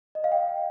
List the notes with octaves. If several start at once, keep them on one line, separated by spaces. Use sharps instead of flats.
D#5
F5
G5